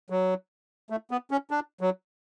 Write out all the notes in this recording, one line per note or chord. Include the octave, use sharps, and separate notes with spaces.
F#3
A3
B3
C#4
D4
F#3